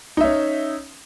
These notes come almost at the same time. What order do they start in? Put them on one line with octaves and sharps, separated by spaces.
D#4 E5 C#4